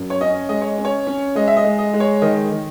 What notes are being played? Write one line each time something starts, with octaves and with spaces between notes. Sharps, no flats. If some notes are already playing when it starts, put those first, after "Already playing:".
Already playing: F#2
C#5
C#4 D#5
G#3 D#5
C#5
C#4
C#5
C#4
G#3 D#5
E5
D#5
G#3
D#5
G#3
C#5
D#3 D#5
D#3